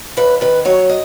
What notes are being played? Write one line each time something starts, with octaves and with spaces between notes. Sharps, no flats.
D#2 B4
D#3 B4
F#3 C#5
D#5